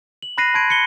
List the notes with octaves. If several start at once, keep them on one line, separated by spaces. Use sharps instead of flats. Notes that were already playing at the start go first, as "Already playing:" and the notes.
F#7
B5 F#6 A#6 C7 D#7
A5 B5 C6 G#6 D7 D#7
C#7 G7